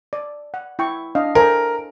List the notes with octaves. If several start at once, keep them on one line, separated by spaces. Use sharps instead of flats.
D5
F#5
E4 G5 C#6
D4 D#5 F5
A4 A#4 C5 G#5